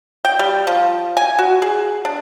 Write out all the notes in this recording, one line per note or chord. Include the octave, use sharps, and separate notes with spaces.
G5
G3
F3
G#5
F#4
G#4
D4